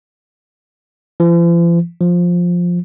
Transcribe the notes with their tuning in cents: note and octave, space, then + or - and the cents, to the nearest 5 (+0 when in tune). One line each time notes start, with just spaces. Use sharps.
F3 -45
F3 +10